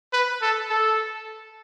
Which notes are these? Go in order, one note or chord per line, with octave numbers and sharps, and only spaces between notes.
B4
A4
A4